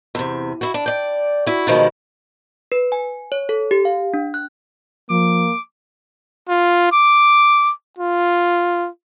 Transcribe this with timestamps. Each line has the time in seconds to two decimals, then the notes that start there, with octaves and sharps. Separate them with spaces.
0.15 E2 C3
0.61 E4 F#4
0.74 D4
0.86 D5 G5
1.46 E4 F#4
1.67 B2 D3 D#3 F3 G3 G#3
2.72 B4
2.92 G#5
3.32 C#5
3.49 A4
3.71 G4
3.85 F5
4.14 D4
4.34 F#6
5.10 F3 A#3 D6
6.49 F4
6.92 D6
7.99 F4